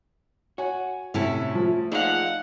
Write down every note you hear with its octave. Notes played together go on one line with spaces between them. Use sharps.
F#4 C#5 G#5
A2 C3 A3 C#4 E4 A4
F3 A3
A#3 D#4 G#4 D5 F5 F#5